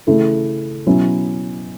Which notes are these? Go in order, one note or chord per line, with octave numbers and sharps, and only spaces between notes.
C#3 E3 A3 E4 A4
B2 F#3 C#4 E4